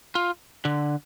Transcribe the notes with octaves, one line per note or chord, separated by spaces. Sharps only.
F4
D3